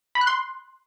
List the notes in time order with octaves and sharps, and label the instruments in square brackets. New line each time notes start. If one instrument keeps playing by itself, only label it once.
[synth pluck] B5
F#6
C6